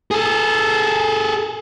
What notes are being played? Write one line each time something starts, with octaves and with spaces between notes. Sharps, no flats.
G#4 A4